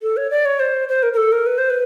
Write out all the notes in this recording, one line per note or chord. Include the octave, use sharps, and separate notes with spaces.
A4
C#5
D5
C#5
C5
C5
A#4
A#4
A4
A#4
B4
C5
B4